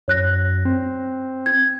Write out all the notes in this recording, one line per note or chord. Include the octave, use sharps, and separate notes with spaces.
F#2 C#5 F#6 A#6
C4
G#6